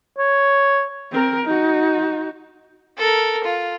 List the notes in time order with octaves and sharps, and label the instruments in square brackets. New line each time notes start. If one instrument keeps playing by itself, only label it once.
[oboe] C#5
[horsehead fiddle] C4 A#4
D#4 F#4
[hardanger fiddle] A4 A#4
F4